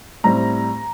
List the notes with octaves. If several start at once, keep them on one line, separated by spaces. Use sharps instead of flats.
A2 G3 C4 A#5